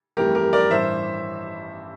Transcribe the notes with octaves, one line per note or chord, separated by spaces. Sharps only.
G1 F2 E3 A3 G4 A#4
G4 A#4
A#4 D5
A1 G2 E3 C5 E5